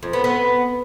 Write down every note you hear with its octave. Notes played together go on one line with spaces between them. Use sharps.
F2
B3
B3